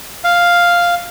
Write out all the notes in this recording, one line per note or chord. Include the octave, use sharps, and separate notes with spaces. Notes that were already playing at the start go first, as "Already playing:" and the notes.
F5